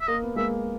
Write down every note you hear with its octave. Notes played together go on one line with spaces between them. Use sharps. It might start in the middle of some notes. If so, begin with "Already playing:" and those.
E5
A#3 D#5
B3
G#3 A#3 E5